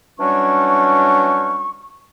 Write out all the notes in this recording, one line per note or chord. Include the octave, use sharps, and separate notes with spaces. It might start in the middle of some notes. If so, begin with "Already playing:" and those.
E3 F#3 G3 C#4 D4 C#6